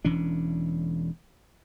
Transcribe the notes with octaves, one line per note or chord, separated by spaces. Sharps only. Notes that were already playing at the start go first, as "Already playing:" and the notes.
E1 E3 C#4 D4